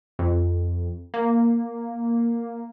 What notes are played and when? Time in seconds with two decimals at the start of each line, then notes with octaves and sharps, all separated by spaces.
0.19 F2
1.14 A#3